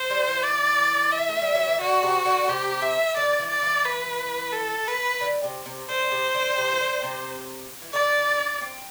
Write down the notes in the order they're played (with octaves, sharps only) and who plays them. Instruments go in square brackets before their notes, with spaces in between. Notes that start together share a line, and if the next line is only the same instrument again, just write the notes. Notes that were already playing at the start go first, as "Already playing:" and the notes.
Already playing: [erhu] C5
[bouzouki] G3
E3
[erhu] D5
E5
[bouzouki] A3
G3
F#3
E3
[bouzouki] D3 [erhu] F#4
[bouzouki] C3
D3
[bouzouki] C3 [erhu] G4
[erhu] E5
[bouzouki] D3 [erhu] D5
[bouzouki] E3
[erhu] D5
[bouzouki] E3
[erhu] B4
A4
B4
[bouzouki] D3
C3
C3
[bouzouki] D3 [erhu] C5
[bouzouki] C3
D3
C3
E3
D3
C3
E3
[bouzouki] D3 [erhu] D5
[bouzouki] C4